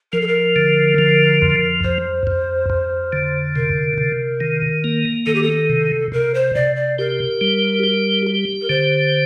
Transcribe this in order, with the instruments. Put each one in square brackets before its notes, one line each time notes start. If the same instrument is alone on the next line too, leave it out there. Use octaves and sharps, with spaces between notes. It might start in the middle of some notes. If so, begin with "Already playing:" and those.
[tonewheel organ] F3 [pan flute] A#4
[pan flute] A4
A#4
[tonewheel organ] D3
F3
F2
[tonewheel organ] F2 [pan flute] C5
[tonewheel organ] F2
F2
D3
[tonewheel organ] C3 [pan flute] A#4
[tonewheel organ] C3
D#3
A#3
[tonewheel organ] D#3 [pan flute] A4
[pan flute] G4
A4
[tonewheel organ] C3
[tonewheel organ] C3 [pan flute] A#4
[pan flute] C5
[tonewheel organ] C3 [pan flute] D5
[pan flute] D5
[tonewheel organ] G4 [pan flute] A#4
[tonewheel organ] G3
G4
G4
[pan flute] A#4
[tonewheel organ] D3 [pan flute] C5